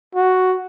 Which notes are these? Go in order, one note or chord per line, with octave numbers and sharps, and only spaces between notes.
F#4